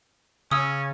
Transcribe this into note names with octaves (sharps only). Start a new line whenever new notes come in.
C#3 C#4 D#6 E6